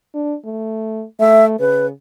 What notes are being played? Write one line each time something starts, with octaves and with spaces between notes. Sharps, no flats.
D4
A3
A3 E5
C#3 B4